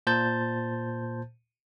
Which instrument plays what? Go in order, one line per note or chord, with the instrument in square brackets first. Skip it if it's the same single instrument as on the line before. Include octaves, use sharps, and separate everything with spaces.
[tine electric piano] A#2 C5 A5 G6 A6